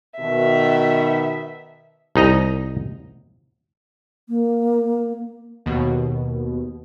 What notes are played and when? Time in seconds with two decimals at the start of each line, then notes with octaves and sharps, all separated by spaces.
0.20 B2 D#3 E5
2.16 C2 D#4 D#5 A#5
4.29 A#3
5.66 D#2 B2